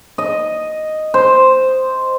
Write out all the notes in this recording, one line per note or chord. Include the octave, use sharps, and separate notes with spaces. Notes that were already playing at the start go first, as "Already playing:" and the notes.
D#5
C5